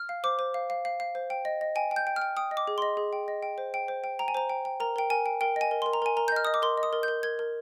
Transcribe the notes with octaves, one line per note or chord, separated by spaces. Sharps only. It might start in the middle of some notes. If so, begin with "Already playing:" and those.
Already playing: F6
F5
C5 D6
C5
F5
F5
F5
F5
C5
G5
D#5
D#5
G5 G#5
G5
G6
G5
F6
G5
G5 D#6
D#5
D6
G#4
D#5 C6
G#4
G5
D#5
G5
C5
G5
C5
G5
G5 A#5
G#5
C5 A#5
G5
G5
A#4 A#5
A#4 G5
A#4 G#5
G5
A#4 G5
D#5 G#5
A#4
A#4 C6
A#5
A#4 G#5
A#4 A#5
G6
D#5 F6
D#5 D#6
D6
A#4 C6
D#5
D#6
A#4
G6
A#4
A#4 G#6
A#4